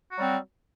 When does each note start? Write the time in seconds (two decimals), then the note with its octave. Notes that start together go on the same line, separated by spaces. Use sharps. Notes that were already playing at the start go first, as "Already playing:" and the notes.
0.12 F#4
0.15 F#3
0.19 G3
0.22 C4